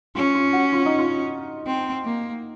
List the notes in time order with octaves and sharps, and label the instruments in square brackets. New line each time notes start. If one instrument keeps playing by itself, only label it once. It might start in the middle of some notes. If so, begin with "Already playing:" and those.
[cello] C#4 [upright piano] F4
[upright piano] F4
F#4
F4
D#4
F4
[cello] C4
A#3